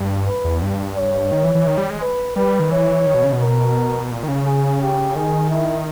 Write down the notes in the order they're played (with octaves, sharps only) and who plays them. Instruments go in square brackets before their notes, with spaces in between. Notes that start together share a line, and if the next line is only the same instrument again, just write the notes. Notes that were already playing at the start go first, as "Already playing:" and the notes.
Already playing: [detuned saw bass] G2
[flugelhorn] B4
[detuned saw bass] E2
G2
[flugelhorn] C#5
[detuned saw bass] D#3
E3
E3
D#3
G3
G#3
[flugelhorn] B4
[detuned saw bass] G3 [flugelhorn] B4
[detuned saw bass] D#3
[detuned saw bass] E3 [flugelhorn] C#5
[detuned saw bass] D#3
B2
C#3
B2
[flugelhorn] A#4
[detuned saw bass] A#2
D#3
C#3
[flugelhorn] G#4
G4
[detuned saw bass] D#3 [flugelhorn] G#4
[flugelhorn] E4